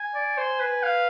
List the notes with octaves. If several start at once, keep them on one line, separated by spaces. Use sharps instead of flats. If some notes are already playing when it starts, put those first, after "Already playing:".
Already playing: G#5
D5
C5
B4
F5